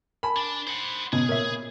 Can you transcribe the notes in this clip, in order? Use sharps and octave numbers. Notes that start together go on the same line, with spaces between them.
A#4 G#5 A5 B5
D4
C5 F#5
B2 C#4 G#4
A#2 A#4 C#5 E5